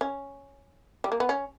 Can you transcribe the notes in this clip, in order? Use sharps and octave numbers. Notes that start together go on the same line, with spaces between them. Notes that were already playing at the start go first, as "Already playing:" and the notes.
C#4
G3
A#3
B3
C#4